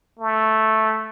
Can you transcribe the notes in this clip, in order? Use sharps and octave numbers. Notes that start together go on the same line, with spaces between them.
A3